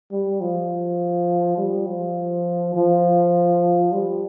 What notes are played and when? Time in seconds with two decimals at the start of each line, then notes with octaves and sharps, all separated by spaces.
0.12 G3
0.41 F3
1.58 G3
1.87 F3
2.75 F3
3.92 G3